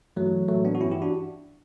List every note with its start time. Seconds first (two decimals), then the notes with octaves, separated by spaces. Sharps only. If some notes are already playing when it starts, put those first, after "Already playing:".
0.16 G2 E3 F#3 A3
0.48 A2 E3 F#3 A3
0.65 B3 D4
0.75 F#4
0.80 G2 E3 C#4 E4
0.91 E4 G4
1.02 D4 F#4